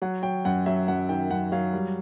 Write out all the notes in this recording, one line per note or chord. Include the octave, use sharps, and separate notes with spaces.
F#3 F#5
F#3 G5
F#2 F#5
F#3 E5
F#2 F#5
D#3 G5
F#2 F#5
F#3 F5
G3